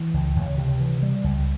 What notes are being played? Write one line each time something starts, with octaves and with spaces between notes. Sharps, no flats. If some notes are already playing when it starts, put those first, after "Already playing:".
Already playing: E3
C#2
C#2
C3
E3
G3
C#2